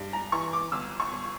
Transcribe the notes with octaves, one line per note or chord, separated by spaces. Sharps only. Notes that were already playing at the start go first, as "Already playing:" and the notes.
Already playing: G2
A#5
E3 C#6
D6
G1 E6
C#6
G1